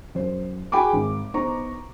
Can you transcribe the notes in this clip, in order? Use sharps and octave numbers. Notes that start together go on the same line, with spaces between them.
F#2 C5
F#4 G#4 G5 G#5 B5 D6
G#1
B3 D#4 C5 A#5 C#6